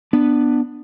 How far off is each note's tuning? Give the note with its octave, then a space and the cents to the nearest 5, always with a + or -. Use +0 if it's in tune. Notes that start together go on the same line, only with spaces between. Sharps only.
B3 +0 D4 +15